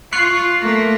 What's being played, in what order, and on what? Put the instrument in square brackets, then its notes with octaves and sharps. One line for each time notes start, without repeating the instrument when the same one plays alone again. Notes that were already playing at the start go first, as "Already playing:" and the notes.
[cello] F4 [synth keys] C#6 F#6 C7
[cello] A3 A#3